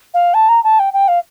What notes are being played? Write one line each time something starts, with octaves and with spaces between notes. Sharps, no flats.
F5
A5
A#5
A5
G5
G5
F5